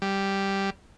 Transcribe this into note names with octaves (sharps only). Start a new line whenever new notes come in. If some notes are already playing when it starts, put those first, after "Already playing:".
G3